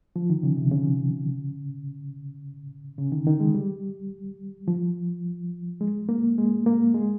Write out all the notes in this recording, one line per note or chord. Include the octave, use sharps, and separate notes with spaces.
F3
D#3
C#3
C3
C#3
C#3
D#3
D#3
G#3
G3
F3
G#3
A#3
G#3
A#3
G#3